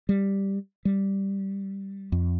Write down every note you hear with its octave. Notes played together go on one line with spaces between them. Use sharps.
G3
G3
F2